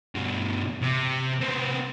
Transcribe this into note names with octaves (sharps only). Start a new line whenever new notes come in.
G2 B2
C3
B3 C4